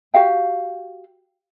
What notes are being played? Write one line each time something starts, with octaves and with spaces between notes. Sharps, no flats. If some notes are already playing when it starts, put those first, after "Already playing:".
F#4 G4 F5 G5